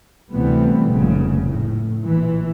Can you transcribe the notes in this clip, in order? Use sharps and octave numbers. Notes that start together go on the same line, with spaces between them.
D2 C3 E3 G3 A3 B3
F1 A#2 C#3
A2
A#1 E3